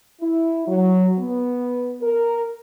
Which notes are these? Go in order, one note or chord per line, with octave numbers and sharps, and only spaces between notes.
E4
F#3
B3
A#4